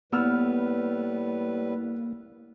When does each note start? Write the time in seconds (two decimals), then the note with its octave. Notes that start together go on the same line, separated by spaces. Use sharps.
0.12 A2 G3 A#3 B3 B4 E6 F6